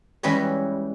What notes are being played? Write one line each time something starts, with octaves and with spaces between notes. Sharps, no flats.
E3 G3 G#3 C#4 B4 C#5